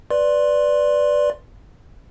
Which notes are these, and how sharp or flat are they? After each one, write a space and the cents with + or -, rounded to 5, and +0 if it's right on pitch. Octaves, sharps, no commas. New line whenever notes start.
B4 +0 D5 +0 C6 +10